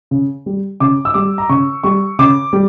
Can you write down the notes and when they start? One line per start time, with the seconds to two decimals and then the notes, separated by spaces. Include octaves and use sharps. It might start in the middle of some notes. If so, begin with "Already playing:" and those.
0.11 C#3
0.46 G3
0.80 C#3 D6
1.05 E6
1.14 G3 D6
1.38 A#5
1.49 C#3 C#6
1.84 G3 C#6
2.19 C#3 D6
2.53 G3